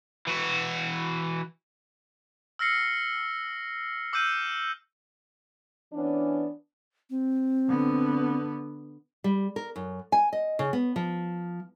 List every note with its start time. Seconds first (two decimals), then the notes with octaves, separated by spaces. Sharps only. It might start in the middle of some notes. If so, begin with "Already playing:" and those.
0.27 E3 F#4
2.59 E6 F6 A#6 C7 C#7
4.13 D6 E6 F6 G6 D#7
5.92 E3 B3 C#4 D4
7.10 C4
7.68 D3 B3
9.24 G3
9.56 A#4
9.76 F#2
10.12 G#5
10.33 D#5
10.59 C#3
10.73 B3
10.96 F3